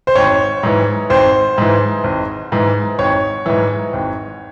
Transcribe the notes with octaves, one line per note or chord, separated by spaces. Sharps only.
C5
G#1 C#5
G#2 E3
G#1 C5
G#2 E3
G#1
G#2 E3
G#1 C#5
G#2 E3
G#1